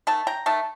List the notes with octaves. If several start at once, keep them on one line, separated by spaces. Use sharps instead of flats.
D#3 A3 A5
G5 A#5
D#3 A3 A5